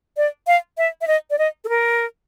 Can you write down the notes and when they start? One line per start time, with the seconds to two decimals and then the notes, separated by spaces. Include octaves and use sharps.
0.17 D5
0.47 F5
0.78 E5
1.01 E5
1.07 D#5
1.30 D5
1.38 D#5
1.64 A4
1.69 A#4